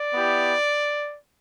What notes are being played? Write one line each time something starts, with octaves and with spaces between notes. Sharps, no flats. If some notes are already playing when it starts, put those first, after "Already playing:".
Already playing: D5
B3 E4 G4